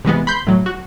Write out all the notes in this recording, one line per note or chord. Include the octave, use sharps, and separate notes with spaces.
C3 E3 G#3 B3
B5 C6 G6
A2 F#3
F#4